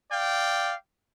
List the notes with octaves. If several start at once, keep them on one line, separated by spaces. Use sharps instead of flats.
D5 F5 G5